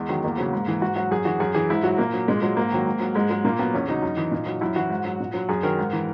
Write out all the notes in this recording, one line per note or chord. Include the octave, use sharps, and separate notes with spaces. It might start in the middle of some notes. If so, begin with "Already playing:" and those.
Already playing: E2 G#3
D#3 F#3
E2 A#3
C#3 F#3
G#2
E3
G#2 F#4
F#3 F#4
F#2 G#4
E3 F#4
F#2 G#4
E3 G#4
G#2 E4
F#3 F#4
A#2 A#3
F#3
A#2 G#3
F#3 G#3
G#2 A#3
D#3 F#3
G#2
F#3
G#2 G#3
F#3 G#3
A#2 A#3
F#3 B3
E2 C#4
C#3 F#3 D#4
F#2
E3
A#2
F#3
F#2 E4
E3 F#4
G#2
F#3
A#2
F#3
F#2 G#4
D#3 F#3 A#4
G#2
E3